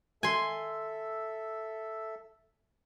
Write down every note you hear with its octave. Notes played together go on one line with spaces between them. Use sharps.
A4 E5 G#5 C6